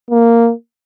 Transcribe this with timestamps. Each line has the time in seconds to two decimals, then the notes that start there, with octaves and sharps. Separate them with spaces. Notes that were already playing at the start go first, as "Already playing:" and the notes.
0.11 A#3